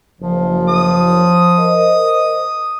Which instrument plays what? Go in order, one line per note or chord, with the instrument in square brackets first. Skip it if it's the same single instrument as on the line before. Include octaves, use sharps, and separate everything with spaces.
[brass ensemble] F#1 [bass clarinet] F3
[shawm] D#6
[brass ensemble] A#4 C5 D#5